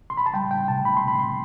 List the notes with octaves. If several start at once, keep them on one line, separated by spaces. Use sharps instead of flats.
C6
B5
A5
G3 G5
G5
C3 A5
B5
C6
C3
B5
C6